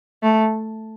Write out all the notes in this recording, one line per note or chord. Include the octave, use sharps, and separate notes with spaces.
A3